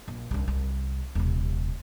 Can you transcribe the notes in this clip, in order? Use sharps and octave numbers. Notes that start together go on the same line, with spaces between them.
A#1
C2 D4
C2
D#1 C3